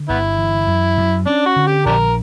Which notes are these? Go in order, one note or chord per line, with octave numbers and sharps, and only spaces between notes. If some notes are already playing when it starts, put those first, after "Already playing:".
Already playing: D3
G1 B3 E4
E3
F#2
F#2
C#4 D4
F#4
D3
G4
A#1 D4 G4 A#4